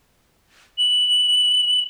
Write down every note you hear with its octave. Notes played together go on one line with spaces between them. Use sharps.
F#7